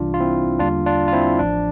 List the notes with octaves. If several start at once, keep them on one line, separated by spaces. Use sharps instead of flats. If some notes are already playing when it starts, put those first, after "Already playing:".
Already playing: C2 C3 E3 G3 D4 F4
F4
C4 E4
E2 D3 G3 A#3 D4 F4
D4 F4
F4
C4 E4
A1 A2 F3 D4